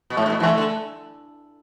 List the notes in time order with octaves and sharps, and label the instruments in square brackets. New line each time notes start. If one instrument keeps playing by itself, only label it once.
[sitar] B2
[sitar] A2 [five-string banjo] A3
[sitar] D3
B2
E3
[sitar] D3 [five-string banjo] A3
[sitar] D3